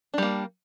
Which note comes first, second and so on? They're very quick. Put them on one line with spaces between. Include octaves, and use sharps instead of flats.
D4 G3 A#3